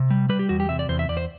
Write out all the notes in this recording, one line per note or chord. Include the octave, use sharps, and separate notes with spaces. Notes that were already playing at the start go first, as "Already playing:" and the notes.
Already playing: C3
G3
G3 B4
G4
E2 F#4
G4
C3 E5
D5
E2 C5
E5
E2 D5
C5